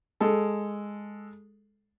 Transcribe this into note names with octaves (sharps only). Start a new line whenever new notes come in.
G#3 A4